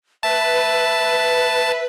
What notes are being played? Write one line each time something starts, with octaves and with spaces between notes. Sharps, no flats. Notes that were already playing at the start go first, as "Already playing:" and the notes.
B4 E5 A5